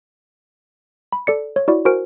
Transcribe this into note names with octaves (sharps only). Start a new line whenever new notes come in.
B5
A4 D5 C#7
C#5
E4 F#4 D5
F#4 A#4 C5 G#5 F6 D7